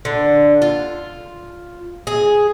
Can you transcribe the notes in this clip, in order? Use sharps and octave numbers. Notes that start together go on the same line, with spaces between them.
D3
F4
G#4